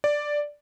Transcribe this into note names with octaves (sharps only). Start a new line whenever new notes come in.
D5